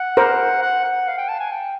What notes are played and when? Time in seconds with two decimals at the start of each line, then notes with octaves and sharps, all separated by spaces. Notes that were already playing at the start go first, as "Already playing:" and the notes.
Already playing: F#5
0.17 A#4 C5
0.62 F#5
0.84 F#5
1.07 F5
1.18 G5
1.29 A5
1.39 G#5
1.51 G5